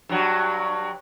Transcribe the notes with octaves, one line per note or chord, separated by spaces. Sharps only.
G2 F#3